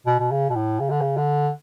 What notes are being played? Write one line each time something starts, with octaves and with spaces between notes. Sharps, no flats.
B2
B2
C#3
B2
A2
C#3
D3
C#3
D3